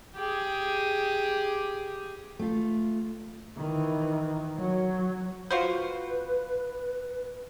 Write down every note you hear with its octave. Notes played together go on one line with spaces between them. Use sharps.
G4 G#4
A3 F4
D#3 E3
F#3
F4 F#4 B4 C5